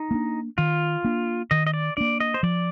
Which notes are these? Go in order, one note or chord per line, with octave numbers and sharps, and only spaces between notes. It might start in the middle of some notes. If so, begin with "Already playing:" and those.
Already playing: D#4
A#3 D4
D#3 F4
A#3 D4
D#3 D#5
D#5
D5
A#3 D4 D5
D#5
C5
F3 D5